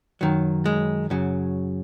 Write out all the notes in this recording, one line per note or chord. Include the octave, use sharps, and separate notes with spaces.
F#2 D#3 F#3
G#3
F#2 C#3 F#3